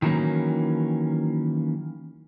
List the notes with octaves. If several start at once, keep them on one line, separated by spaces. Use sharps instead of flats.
D#3 E3 F#3 A#3 C#4